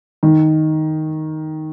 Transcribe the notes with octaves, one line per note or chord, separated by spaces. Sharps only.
D#3